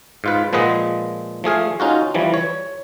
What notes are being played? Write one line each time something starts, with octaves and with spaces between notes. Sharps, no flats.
G#2 F4 B4
A#2 F3 G#3 B4 D#5 F#5
F3 A3 G#4 F5
C#4 D#4 F4 F#4
E3 F3 G3
C#5